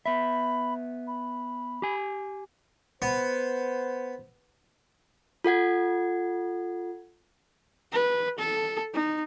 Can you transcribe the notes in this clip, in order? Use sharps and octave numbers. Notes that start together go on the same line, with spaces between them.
B3 E5 B5
B5
G4 G#5
B3 C5
F4 A4 F#5 G#6
B4
A4
D#4